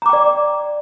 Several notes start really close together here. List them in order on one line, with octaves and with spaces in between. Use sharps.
A#5 D6 G5 D5